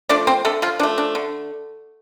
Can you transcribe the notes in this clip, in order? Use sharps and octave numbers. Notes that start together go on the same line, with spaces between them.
F3 A3 D4 D5
C4 C5
D3 A3 A4
F3 F4
F3 A3 D4
D4
D3